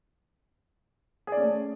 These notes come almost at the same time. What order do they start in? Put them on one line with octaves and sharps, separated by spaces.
G#4 D5 C#4 A3